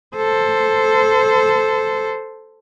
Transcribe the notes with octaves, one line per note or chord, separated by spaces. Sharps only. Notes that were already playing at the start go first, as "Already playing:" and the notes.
A4 C5